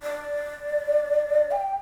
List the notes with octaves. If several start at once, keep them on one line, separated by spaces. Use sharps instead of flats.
D5
G5